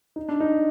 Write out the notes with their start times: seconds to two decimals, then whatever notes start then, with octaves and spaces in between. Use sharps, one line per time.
0.16 D#4
0.29 D4
0.40 D#4